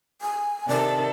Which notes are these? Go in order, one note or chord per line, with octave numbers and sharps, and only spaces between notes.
G#5
C3 D#3 A4 D5